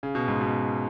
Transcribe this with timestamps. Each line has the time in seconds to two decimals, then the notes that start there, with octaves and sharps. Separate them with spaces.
0.03 C#3
0.15 B2
0.28 G#2
0.41 B2